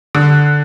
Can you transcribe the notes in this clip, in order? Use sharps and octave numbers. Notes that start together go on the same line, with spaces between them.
D3